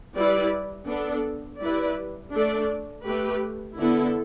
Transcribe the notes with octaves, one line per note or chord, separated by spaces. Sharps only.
G3 E4 B4 D5
B3 D4 A4
G3 E4 B4 D5
A3 D4 A4 D5
A3 G4 B4
D3 B3 E4 A4